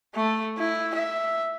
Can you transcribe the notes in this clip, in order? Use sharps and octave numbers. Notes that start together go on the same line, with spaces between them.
A3
E4
E5